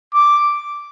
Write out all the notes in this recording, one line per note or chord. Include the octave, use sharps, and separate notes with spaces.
D6